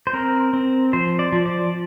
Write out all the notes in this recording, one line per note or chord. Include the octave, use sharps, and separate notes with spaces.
C5
C4 A#4
C4
F3 C5
D5
F3
D5